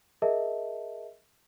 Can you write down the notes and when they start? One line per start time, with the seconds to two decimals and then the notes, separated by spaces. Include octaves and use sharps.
0.22 G#4 A#4 D#5 E5 A5